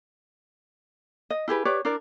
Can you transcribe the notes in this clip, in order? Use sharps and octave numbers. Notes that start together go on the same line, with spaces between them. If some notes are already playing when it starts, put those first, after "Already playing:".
D#5
E4 G4 G#4 B4
G4 B4 C#5 D5
D4 E4 A#4 D5